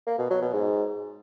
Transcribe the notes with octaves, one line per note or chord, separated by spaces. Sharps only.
A#3
B2
F#3
B2
G#2